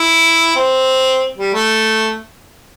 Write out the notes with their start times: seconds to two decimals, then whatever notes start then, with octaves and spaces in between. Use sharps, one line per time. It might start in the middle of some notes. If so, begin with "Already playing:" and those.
Already playing: E4
0.56 C4
1.38 G3
1.54 A3